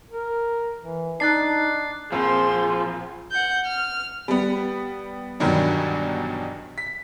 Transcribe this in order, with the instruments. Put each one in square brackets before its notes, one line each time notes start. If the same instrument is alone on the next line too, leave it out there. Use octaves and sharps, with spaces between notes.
[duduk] A#4
E3
[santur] D4 [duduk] D#4 [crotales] F#6 A6 C7
[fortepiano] A#1 C4 [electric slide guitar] F3 [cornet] G#4 [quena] C6
[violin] F#5 G6
F6
[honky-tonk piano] G3 B3
E2 G2 B2 D#3 F#3 D4
B6